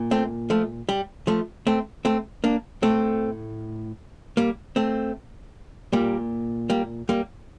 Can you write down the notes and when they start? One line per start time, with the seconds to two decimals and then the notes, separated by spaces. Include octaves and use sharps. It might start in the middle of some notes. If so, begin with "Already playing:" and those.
Already playing: A#2
0.11 A3 C4
0.50 F3 A3
0.89 G3
1.27 F3 A3
1.67 A3 C4
2.05 A3 C4
2.44 A#3 D4
2.82 A2 A3 C4
4.37 G3 A#3
4.76 A3 C4
5.93 A#2 G3 A#3
6.70 G3 A#3
7.09 G3 A#3